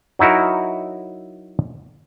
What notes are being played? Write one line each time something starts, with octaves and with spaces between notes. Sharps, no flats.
F#3 D#4 E4 F#4 A#4